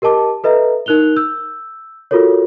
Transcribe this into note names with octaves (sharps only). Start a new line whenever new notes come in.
G4 A#4 D#5 A5 D6
A4 B4 D#5 E5 A#5
D#4 A#4 F#6 F7 G7
E6 G6
F4 F#4 A4 A#4 C#5